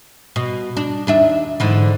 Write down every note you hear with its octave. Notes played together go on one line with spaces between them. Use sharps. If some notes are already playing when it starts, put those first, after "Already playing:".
B2
D4
D#2 D4 E5
G#2 D3 E3